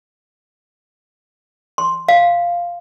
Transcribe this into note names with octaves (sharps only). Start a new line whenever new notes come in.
C6
F5